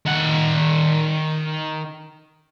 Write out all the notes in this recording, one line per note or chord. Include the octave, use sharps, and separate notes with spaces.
D#3 F#5